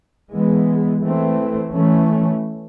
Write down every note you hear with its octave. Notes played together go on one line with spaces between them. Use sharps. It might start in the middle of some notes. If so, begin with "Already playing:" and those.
E3 G#3 B3
E3 A3 C4
E3 A3 C#4